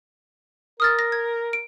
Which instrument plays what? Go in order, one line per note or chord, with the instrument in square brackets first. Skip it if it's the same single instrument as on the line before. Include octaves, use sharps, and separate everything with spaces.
[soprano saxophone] A#4 [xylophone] D#6 F6 A6
[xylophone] A#6
G#6
D7